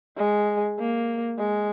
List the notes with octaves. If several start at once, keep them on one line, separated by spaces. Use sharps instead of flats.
G#3
A#3
G#3